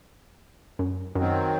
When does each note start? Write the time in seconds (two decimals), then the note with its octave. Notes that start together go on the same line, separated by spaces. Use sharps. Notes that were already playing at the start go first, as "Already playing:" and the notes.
0.79 F#2
1.15 F#2 D#3 F#3 C4